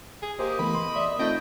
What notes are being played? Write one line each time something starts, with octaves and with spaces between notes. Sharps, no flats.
G#4
A#3 G4 C5 D#5
E3 A3 B3 B5
C6
D5 E5
A3 C4 D#4 F4 D#5 G5